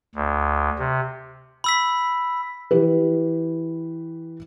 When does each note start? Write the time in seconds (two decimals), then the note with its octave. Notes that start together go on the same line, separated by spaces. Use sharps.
0.15 D2
0.79 C3
1.64 B5 E6 B6
2.71 E3 G4 B4